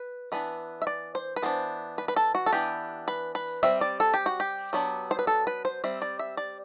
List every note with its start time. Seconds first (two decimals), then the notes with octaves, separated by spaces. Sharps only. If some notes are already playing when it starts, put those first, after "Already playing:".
Already playing: B4
0.32 E3 B3 D4 B4
0.82 E5
0.87 D5
1.15 C5
1.36 B4
1.42 E3 B3 D4 C5
1.98 B4
2.08 B4
2.16 A4
2.35 F#4
2.46 A4
2.52 E3 B3 D4 G4
3.08 B4
3.35 B4
3.63 G3 C4 E5
3.81 D5
4.00 A4
4.14 G4
4.26 F#4
4.40 G4
4.73 F#3 B3 D4
5.11 C5
5.19 B4
5.27 A4
5.47 B4
5.65 C5
5.84 G3 C4 E5
6.02 D5
6.19 E5
6.37 D5